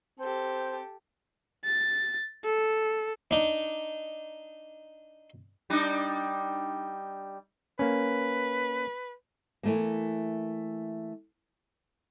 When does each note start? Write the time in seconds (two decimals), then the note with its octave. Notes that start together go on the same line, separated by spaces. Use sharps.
0.20 C4 G4 A4
1.65 A6
2.44 A4
3.31 D4 D#4
5.70 G3 D4 D#4
7.79 A#3 C#4 B4
9.63 E3 A3 A#3